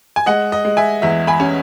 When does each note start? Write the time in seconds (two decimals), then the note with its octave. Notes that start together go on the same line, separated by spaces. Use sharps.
0.16 G#5
0.26 G#3 D#5 F#5
0.52 D#5
0.65 G#3
0.77 E5 G#5
1.02 E2 E5
1.27 G#5 B5
1.40 C#4